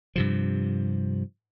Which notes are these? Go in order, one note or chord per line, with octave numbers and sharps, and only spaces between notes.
G2 C3 F3